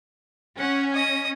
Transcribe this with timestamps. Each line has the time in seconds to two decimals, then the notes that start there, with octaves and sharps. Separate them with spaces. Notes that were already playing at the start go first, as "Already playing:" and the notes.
0.59 C#4 F#5
0.94 D#5 D#6